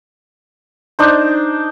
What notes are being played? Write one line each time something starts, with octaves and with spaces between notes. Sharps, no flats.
D4 D#4 C5